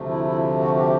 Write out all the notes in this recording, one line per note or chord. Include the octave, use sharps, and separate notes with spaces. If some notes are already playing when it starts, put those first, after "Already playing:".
Already playing: D2 C3 F3 A3
E4
E4
F#4
G4